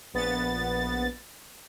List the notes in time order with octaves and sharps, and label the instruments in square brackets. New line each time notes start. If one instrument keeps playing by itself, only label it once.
[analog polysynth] A#1 B3 A6